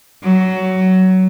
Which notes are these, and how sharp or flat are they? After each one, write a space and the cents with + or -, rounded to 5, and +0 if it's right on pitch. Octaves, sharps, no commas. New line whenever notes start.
F#3 +15